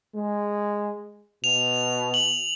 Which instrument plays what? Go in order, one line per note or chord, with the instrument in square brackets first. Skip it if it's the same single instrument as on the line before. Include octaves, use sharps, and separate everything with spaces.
[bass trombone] G#3
[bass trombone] B2 [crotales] F7
[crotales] F#7